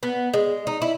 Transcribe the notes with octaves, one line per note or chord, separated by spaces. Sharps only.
B3
G#3
D#4
E4